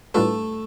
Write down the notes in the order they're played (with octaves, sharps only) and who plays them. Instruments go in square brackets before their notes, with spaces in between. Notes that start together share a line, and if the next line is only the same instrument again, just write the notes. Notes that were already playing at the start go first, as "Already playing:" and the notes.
[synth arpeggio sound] A2 G3 D4 F4 B4 [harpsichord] A3 A4